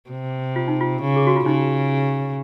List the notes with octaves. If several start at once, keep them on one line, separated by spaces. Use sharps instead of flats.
C3
F4
D#4
F4
C#3
G#4
F#4
F4
C#3 D#4